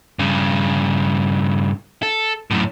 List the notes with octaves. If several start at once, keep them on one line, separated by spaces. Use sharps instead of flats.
G2 C#3
A4
F#2 A2